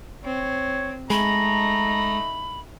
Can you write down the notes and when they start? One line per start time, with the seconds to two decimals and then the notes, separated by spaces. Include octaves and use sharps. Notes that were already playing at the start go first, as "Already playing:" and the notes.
0.24 C4 C#5
1.10 G#3 A3 D#4 A#5 B5